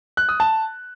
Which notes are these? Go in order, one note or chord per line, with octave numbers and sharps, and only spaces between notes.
F#6
D#6
A5